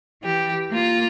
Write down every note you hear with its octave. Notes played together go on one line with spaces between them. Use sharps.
E3 G4
A#3 F4